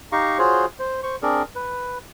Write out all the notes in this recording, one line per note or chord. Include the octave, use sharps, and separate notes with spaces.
D#4 G4 F5 A#5 C#6
F4 F#4 G#4 C5 C#5
C5
C5 C#6
C4 D4 G#4 A#4 D5
B4